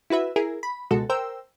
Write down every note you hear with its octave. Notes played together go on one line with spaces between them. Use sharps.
E4 F#4 B4 E5
E4 G#4 A#4
B5
C#2 B2 G#3 F#4 A4
A#4 C5 G5 E6